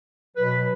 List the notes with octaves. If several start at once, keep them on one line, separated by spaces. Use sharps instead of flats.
B2 F#3 B4